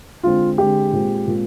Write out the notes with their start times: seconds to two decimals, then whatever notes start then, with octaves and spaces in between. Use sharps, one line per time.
0.24 D3 G#3 C4 F4
0.58 D3 G#3 C4 G4
0.93 A#2 G#3 C4
1.27 A#2 G#3 C4